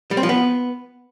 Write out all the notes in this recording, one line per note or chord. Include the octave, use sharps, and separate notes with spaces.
G3
C4
F3
B3